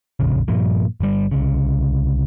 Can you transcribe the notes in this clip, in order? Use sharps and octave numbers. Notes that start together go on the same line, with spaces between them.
F1 A#1 C#3
G2 A#2 F3
G1 G3
C2 C#3